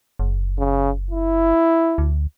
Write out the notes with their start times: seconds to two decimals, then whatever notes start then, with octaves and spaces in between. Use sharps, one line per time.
0.19 F#1
0.58 C#3
1.10 E4
1.98 D2